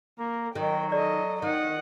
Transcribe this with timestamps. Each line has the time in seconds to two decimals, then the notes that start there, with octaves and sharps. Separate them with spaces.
0.19 A#3 A#4
0.55 D#3 F#3 G5
0.92 A4 D5 D#5
1.42 D#3 D#5 F#5